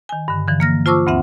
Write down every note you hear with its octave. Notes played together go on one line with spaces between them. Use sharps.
D#3 G#5
G2 D3
D3 E3 F3
A#3 F6 A#6
F4 C5 A5 C#6 D6 E6
D2 G2 C4 E5 F#5